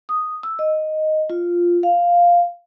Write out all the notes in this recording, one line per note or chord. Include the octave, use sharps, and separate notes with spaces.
D#6
E6
D#5
F4
F5